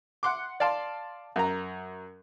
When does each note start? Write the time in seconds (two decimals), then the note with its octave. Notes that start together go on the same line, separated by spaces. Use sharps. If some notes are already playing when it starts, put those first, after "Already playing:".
0.23 F#5 C6 D6
0.60 D5 F5 A5 C6
1.36 F#2 A#5